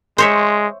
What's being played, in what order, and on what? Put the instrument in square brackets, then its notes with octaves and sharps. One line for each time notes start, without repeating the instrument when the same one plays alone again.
[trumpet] G#3 [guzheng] C5 C#5 E5